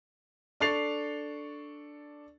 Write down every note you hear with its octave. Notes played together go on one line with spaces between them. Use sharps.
D4 A4 C#6 A6 C7 F7